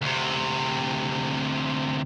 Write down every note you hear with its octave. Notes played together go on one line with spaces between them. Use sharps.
D2 C3